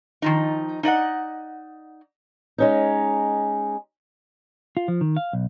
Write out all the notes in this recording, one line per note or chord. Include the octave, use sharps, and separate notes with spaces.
D#3 F3 D#4
D#4 D5 D#5 F#5
G#3 C#4 D#4
F4
F3
D#3
F5
B1